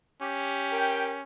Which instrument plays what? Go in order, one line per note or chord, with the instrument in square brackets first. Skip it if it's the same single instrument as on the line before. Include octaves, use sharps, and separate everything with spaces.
[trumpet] C#4 [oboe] G4
[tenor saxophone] A#4 [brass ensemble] G5